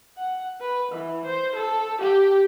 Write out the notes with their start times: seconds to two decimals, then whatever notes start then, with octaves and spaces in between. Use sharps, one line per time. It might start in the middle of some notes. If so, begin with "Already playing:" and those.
0.17 F#5
0.61 B4
0.92 E3
1.26 C5
1.56 A4
2.01 G4